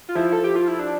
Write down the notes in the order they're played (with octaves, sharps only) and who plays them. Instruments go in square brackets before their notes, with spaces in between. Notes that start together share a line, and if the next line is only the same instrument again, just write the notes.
[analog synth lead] F4
[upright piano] F3 [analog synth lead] E4
[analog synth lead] A4
G4
F4
E4
D4